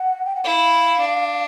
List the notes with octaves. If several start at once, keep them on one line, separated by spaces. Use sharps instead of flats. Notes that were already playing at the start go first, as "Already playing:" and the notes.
Already playing: F#5
G5
F#5
E4 F5
D4